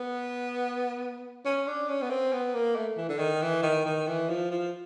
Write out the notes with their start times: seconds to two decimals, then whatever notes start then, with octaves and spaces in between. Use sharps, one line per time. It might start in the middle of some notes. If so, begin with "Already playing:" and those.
Already playing: B3
1.46 C#4
1.68 D4
1.89 C#4
2.02 B3
2.10 C4
2.33 B3
2.55 A#3
2.76 A3
2.97 E3
3.09 D3
3.19 D#3
3.42 E3
3.63 D#3
3.86 D#3
4.07 E3
4.29 F3
4.51 F3